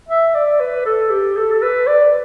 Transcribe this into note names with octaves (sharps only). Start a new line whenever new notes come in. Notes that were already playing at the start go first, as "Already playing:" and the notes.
E5
D5
B4
A4
G4
A4
A4
B4
D5